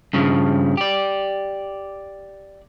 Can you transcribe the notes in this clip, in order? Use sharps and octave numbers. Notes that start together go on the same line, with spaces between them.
G2 C#3 F3
G4 D5